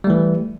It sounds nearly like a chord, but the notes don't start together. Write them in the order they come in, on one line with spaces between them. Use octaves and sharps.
G3 A3 E3